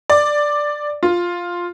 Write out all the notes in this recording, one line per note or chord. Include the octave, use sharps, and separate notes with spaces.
D5
F4